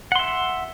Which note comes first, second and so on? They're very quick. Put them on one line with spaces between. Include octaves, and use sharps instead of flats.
F#5 C6 E5